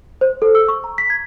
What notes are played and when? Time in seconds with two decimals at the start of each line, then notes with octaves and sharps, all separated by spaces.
0.21 C5
0.42 A4
0.55 E6
0.68 C#6
0.84 A#5
0.98 B6
1.10 G#6